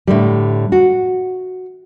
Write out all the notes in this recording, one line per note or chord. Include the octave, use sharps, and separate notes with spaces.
A2 D3 G3
F#4